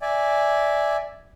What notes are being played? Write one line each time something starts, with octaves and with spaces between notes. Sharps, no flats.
D5 E5 G#5